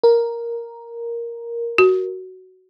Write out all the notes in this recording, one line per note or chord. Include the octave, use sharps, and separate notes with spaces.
A#4
F#4